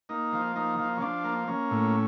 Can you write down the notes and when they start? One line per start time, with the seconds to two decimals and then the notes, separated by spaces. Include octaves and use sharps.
0.09 A#3 D#4
0.33 F3
0.55 A#3 D#4
0.78 F3
0.97 C#4
1.01 F3 D4
1.24 A#3
1.48 A#3 C#4
1.71 A2